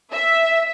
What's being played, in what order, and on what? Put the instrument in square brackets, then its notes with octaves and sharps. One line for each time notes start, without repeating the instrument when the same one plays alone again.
[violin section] E5